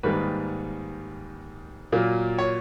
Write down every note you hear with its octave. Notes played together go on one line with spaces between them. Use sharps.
G#2 D#3 G3 A#3 B4
A#2 F#3 A#3
C#5